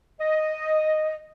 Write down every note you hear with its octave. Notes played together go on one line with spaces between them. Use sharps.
D#5